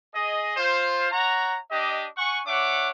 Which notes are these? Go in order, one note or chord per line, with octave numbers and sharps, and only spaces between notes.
G#4 D#5
F4 C5
C#5 F#5 A#5
D4 G4 D#5
F#5 G#5 C#6
D4 C#5 E5 F#5 D6